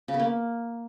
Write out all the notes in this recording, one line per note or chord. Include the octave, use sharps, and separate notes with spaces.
C#3
B3
A#3